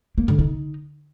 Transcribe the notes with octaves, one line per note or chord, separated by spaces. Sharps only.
A#3
D3
D#4